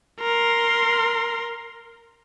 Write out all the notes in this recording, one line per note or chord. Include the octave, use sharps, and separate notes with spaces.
A#4 C6